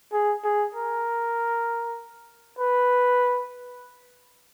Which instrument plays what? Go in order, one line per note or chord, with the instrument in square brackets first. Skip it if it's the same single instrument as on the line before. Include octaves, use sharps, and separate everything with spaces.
[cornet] G#4
G#4
A#4
B4